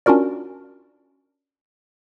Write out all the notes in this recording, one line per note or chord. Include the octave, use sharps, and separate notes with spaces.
C#4 D4 F4 F#4 A#4 D5